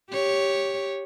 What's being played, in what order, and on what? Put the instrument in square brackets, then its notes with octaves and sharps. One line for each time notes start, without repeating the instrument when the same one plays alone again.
[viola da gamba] G4 C#5